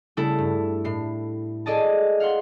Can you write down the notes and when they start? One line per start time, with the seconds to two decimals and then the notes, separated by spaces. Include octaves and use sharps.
0.17 C#3 G3 A3 E4 A4
0.38 G2
0.84 A2 C7
1.66 G#4 A4 D5 D#5 A5
2.20 F5 F#5 C6